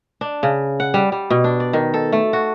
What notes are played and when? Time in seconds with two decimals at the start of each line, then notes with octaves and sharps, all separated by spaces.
0.21 D4
0.43 C#3
0.80 F#5
0.94 G3
1.12 G3
1.30 B2
1.44 D4
1.60 D5
1.73 D#3
1.94 A4
2.12 A3
2.33 F#4